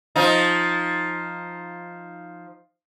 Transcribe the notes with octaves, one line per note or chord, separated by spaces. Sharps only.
F3 D#4